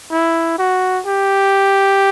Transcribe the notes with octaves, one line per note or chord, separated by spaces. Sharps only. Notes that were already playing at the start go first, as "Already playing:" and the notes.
E4
F#4
G4